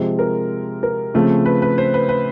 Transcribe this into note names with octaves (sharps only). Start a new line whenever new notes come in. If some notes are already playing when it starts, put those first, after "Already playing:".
Already playing: C3 F3 G#3 C4
A#4
A#4
C#3 F3 A3 C4
B4
B4
C5
B4
B4